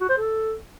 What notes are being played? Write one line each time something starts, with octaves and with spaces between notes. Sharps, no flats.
F#4
C5
A4